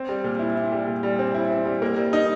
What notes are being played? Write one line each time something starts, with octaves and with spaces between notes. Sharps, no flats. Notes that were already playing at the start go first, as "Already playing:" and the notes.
Already playing: C4
G3
A#2
E4
E4
G3
A#2
G3
C4
E4
C4
G3
A#3
G3
D#4